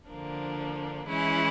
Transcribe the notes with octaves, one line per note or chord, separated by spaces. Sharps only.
D3 F3 A#3 D4
E3 G#3 C#4 E4